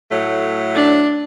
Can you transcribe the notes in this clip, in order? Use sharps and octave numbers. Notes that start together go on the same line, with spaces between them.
A2 F#3 A3
D4